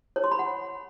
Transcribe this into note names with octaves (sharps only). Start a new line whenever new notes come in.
C#5
C6
B5
F#5